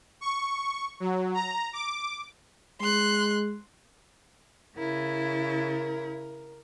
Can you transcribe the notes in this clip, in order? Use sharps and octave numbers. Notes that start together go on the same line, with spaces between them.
C#6
F#3
A#5
D6
G#3 C6 F#6
C#3 E4 A#4